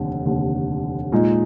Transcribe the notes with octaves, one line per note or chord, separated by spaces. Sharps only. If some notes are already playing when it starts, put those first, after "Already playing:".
Already playing: F1 D#2 D3
F1 D#2 D3
A#2 F3 G#3 D#4